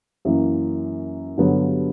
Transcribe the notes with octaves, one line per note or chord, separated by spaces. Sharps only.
F#2 E3 A#3
G2 D3 F#3 B3